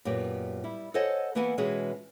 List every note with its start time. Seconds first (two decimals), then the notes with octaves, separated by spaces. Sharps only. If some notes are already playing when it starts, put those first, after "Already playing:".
0.05 F#2 A#2 B3 G4
0.64 G3 E4
0.94 A4 C5 C#5 D#5 F#5 G#5
1.35 E3 A#3 B3 E4 F#5 G#5
1.58 B2 E3 G#3 C#4 F#4 G#4